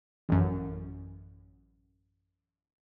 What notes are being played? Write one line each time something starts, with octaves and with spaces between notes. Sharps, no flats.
A1 F#2